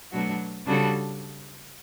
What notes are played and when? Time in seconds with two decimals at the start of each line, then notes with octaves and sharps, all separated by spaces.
0.12 B2 F#3 A3 D4 F#4
0.66 C#3 G3 D4 F#4 A4